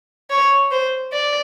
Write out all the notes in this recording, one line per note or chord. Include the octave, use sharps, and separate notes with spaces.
C#5
C5
D5